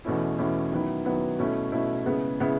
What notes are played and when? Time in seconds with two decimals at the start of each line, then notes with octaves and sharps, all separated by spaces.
0.05 E2 B2 A3 C#4 E4
0.38 E2 B2 A3 C#4 E4
0.72 D#3 F#3 B3 E4
1.05 D#3 F#3 B3 E4
1.39 B2 A3 C#4 E4
1.72 B2 A3 C#4 E4
2.05 C#3 G#3 B3 E4
2.40 C#3 G#3 B3 E4